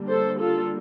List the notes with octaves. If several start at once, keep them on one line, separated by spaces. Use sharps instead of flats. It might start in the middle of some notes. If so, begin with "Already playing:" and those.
Already playing: D3 G3 A#3 D4
A4 C5
F4 A4